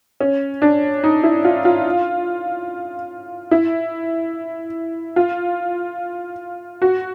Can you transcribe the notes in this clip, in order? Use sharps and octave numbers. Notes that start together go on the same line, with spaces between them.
C#4
D4
D#4
E4
F4
F4
E4
F4
F#4